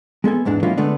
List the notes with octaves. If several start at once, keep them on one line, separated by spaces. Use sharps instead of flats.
G#3 B3 A4 G#5
E2 G#2 E3 D4
F#3 G#3 A#3 C#4 E4 F4
D3 G#3 A3 B3 D4